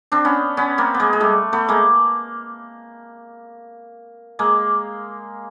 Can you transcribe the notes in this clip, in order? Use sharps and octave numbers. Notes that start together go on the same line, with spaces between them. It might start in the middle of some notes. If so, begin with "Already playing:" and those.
C4 D4
B3 C#4
B3 C#4
A#3 C4
B3
G#3 A#3
G#3
G3 A3
A3 B3
G#3 A#3
G#3 A#3